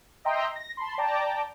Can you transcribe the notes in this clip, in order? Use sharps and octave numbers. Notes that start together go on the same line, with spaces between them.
D#5 E5 G5 A#5 C6
A#6
A5 B5 C6
D5 G5 A5 A#5 D6